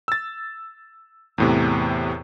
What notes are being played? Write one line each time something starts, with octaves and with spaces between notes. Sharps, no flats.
E6 A6
E2 A2 C3